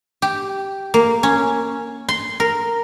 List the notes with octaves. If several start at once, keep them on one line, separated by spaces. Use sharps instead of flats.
G4
A#3
C#4
C6
A#4